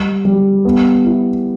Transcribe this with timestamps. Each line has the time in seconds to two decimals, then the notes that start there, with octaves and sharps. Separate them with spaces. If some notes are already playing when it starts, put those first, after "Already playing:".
Already playing: G3
0.25 G3
0.65 B3
1.04 E4